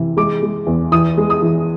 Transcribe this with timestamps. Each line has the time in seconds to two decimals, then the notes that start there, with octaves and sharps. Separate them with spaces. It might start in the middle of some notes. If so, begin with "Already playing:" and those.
Already playing: C3 E3
0.17 G#3 D6
0.42 G#3
0.67 E2
0.92 E3 D#6
1.17 G#3
1.30 D#6
1.42 E3